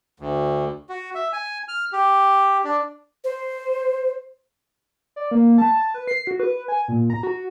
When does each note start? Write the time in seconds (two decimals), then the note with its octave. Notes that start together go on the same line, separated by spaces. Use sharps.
0.20 D2
0.89 F#4
1.15 E5
1.33 G#5
1.68 F6
1.93 G4
2.64 D4
3.24 C5
5.16 D5
5.31 A#3
5.58 A5
5.94 B4
6.08 C7
6.27 F#4
6.40 B4
6.68 G#5
6.88 A#2
7.10 A#5
7.23 F#4